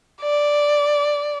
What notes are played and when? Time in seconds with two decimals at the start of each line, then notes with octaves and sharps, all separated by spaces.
0.22 D5